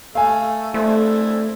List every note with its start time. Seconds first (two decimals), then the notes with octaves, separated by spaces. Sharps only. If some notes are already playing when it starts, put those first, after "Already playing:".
0.15 A3 F5 G#5
0.74 A3 C4 D4 E4